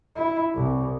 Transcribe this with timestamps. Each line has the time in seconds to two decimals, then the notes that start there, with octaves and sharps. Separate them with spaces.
0.16 E4
0.54 C2